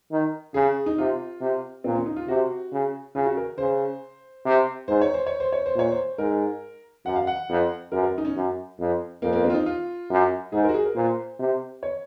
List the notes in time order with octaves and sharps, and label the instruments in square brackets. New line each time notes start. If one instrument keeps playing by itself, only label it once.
[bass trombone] D#3
[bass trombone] C#3 [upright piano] G#4
[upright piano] D#4
[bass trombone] C3 [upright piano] F4
[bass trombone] C3
[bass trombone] A#2 [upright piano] C4
[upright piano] C#4
D#4
F4
[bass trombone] C3 [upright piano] F#4
[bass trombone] C#3
[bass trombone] C#3 [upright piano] F4
[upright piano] F#4
A#4
[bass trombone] C#3 [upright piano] C5
[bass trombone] C3
[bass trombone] G#2 [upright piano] C5
[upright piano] C#5
C5
C#5
C5
C#5
C5
[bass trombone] A#2 [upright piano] C#5
[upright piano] C5
[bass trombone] G#2 [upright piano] A#4
[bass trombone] F#2 [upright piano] F#5
[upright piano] F5
F#5
[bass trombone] F2
[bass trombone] F#2 [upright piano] A#4
[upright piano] A#4
D#4
C#4
[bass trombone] F#2
F2
[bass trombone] F2 [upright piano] A#3
[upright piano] A#3
C4
F4
D#4
F4
[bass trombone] F#2
[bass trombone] G#2 [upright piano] G#4
[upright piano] A#4
F#4
G#4
A#4
[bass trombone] A#2 [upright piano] C5
[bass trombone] C3
[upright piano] C#5